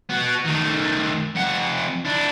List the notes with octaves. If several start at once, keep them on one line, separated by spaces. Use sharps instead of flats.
B3 F#4
D#3 A3
F2 F#5
D4 E4